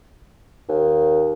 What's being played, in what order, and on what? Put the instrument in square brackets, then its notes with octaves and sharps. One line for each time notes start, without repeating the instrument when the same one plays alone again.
[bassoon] D#2